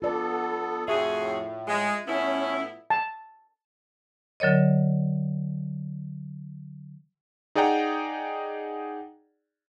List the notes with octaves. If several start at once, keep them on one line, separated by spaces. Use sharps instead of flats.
B3 F4 A4 D5
F2 A2 F#4 G#4 E5
G#3
A2 B3 C#4 E4
A5
D3 F#3 A#4 C#5 D#5
D#4 G#4 D5 F#5 G5 A#5